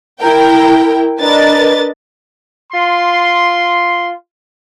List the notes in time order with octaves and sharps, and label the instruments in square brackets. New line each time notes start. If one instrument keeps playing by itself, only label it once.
[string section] E4 A#4 G5
D4 A#4 B4 D#5 A6
[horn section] F4 C6